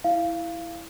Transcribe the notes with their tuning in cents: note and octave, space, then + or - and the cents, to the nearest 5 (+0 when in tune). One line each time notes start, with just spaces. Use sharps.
E4 +0 F5 -15